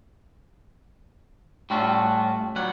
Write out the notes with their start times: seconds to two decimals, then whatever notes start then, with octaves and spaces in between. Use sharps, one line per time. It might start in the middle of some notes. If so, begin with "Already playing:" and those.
1.70 A2 G3 A3 C#4 F4 F#4
2.56 F#3 G3 C#5 F#5